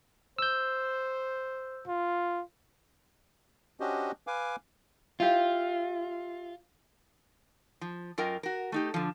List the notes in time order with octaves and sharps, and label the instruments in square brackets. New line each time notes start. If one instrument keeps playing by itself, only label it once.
[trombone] C5 [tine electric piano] E6 G6
[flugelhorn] F4
[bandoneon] C#4 D4 F#4 G4 C5 D#5
B4 F5 G#5 D6
[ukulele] E4 G4 F5 [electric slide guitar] F4
[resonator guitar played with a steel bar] F3
F#2 F4 A#4 D#5 G5
F#4 A#4
A3 D#4 G4
D3 F3